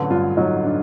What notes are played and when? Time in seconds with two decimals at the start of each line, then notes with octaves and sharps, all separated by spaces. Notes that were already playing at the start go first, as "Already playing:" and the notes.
Already playing: A1 D3 F#3 B4
0.10 G2 F4
0.37 F#3 D#4
0.64 D4